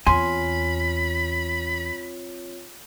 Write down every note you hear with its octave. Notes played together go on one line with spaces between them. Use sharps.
E2 C4 F4 C#5 G#5 B5 C6